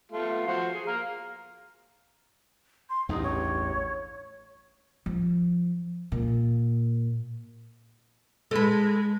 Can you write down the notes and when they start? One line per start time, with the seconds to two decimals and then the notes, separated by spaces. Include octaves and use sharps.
0.12 A3 B3 F4
0.47 F3 F#4 C5
0.74 G#4
0.87 F5 A#5
2.89 C6
3.09 A1 E2 G2 D#4
3.24 C#5
5.06 F3
6.12 A#2
8.51 G#3 A4 B4